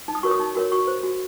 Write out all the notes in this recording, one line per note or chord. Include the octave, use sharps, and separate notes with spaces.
D#4
D#6
F#4 A#4 C#5 C#6
D#6
D#4
F#4 A#4 C#5
F#4 C#6
C5
F#4